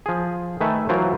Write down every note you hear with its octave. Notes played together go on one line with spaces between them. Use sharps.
F3 G#4
D#3 A3 B4 E5 G#5
E3 F#3 F4 A#4 C5